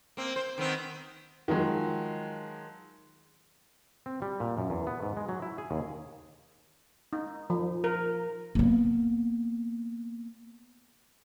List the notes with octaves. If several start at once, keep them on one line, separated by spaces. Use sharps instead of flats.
A#3 C4
C5
D#3 B3 C4
D#3 F3 F#3 G#3
C4
G3
A#2
F#2
E2
B3
G#2
G#3
F#3
E4
G#4
D#2
D#4
F3
A#4
A#3 B3